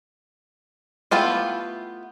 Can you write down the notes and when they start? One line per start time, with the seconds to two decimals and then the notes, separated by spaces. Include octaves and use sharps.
1.11 A3 B3 E4 F4 G4